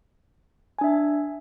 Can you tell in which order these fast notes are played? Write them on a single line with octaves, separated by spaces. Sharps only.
G#5 D4 E5